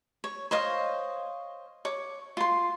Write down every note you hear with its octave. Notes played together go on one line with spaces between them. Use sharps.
C#5
C5 C#5 D#5 F5
C#5 D6
F4 C6